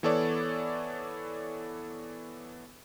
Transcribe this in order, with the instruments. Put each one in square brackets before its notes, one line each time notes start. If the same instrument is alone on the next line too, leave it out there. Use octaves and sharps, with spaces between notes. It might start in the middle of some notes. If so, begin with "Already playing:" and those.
[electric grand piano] E3 B3 A4 C#5 D5